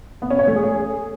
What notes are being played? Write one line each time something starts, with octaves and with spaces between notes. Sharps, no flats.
B3
C#4
C#5
A3
G#4